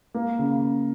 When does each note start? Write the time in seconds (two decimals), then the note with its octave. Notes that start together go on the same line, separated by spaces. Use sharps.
0.14 A#3
0.39 C#3